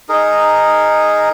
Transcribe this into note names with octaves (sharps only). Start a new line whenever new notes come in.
D#4 G#4 A#4